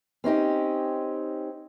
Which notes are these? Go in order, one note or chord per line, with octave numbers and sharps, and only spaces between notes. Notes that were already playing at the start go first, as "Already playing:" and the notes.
C4 C#4 D#4 G4